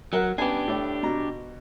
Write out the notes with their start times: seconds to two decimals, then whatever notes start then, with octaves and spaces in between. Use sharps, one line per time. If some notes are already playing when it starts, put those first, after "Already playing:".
0.13 F#3 A#4 F#5
0.38 B3 C#4 D4 G4 G#5
0.68 A2 D5
1.03 B2 A#5